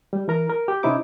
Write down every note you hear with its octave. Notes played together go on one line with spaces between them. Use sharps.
G3
E3 A#4 A#5
A#4
G4
C3 C#4 D#4 E4 C5 D6